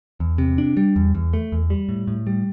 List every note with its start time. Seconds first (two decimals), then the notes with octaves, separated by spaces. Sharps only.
0.20 E2
0.38 C3
0.58 D4
0.77 G3
0.96 E2
1.15 E2
1.33 A3
1.52 E2
1.70 G3
1.89 A2
2.08 A2
2.27 G3